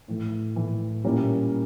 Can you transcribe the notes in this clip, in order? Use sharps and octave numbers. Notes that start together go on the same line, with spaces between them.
A2 E3 A3
A2 E3 A3
A#2 G3 C#4 E4 A#4